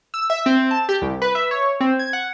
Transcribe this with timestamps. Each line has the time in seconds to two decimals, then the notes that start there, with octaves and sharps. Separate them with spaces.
0.14 E6
0.30 E5
0.46 C4
0.71 A5
0.89 G4
1.02 C2
1.22 B4
1.35 E5
1.51 C#5
1.80 C4
1.99 G#6
2.13 F#5